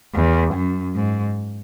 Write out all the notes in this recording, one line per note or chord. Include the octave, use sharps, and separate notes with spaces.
E2
F#2
G#2